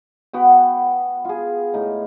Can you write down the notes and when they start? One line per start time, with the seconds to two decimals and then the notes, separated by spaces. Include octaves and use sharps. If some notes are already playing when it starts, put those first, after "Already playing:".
0.33 B3 F#4 G5
1.25 F4 G#4
1.74 A2 D#4